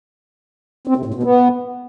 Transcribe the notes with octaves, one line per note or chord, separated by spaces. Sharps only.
C4
C3
A2
B2
B3